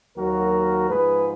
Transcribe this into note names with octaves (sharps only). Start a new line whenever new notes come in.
D#2 D#3 F#3 A#3 F#4 A#4
G#2 F3 G#3 G#4 B4